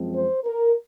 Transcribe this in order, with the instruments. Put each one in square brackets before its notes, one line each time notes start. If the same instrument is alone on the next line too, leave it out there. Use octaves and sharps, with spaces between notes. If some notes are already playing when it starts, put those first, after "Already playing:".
Already playing: [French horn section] F#2 F3 G#3 C4
C5
A#4